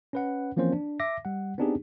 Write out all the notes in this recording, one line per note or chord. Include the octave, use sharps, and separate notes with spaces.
C#4 B4 F#5
E3 F3 A#3 C4 C#4 C5
D4
E5 D6 A#6
G3 F#5
B3 C4 D4 D#4 G4 G#4